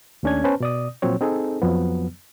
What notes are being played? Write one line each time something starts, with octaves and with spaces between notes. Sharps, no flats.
D#2 A3 C#4 D4 G#6
B3 C#4 B4 C5 A5
B2 D5 D#6
A#2 F3 F#3 C4 C#5
C4 D#4 G#4 A4
F2 F3 F#3 B3